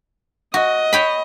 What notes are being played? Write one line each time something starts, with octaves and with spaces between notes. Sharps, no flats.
F#4 D#5
C#5 G5 B5